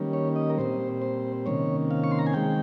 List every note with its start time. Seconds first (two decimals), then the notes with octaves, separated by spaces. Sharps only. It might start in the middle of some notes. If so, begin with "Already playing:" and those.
Already playing: D#3 G3 A#3 C#4
0.13 C#5
0.36 D#5
0.50 A#4
0.58 A#2 G3 C4 C5
1.02 C5
1.46 C3 D#3 A#3 C#4 C#5
1.91 F5
2.04 C#6
2.11 C6
2.19 A#5
2.27 G#5
2.33 D#3 G#3 C4 G5